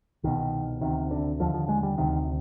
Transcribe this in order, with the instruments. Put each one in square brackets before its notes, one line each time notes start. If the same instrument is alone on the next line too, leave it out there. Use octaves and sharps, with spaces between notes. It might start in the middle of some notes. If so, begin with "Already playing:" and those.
[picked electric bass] C2 B2 D#3
D2 C3 D#3
D3
D#2 D3 F3
F3
G#3
G3
D2 C3 D#3